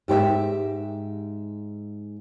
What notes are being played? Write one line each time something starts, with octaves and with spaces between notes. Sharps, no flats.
G#2 G4 C5 E5